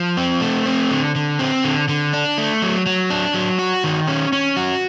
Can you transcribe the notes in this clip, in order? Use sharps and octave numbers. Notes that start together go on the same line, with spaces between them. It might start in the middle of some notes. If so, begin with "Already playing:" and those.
Already playing: F3
C4
A3
C4
D3
D3
C4
D3
D3
D4
A3
F#3
F#3
D4
F#3
F#4
D#3
C#4
C#4
F#4